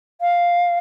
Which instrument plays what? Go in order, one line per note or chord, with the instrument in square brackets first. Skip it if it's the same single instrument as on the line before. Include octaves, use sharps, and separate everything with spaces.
[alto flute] F5